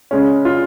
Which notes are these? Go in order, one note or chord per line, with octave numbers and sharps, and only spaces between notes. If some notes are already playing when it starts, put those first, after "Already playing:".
C#3 G#3 C#4
F4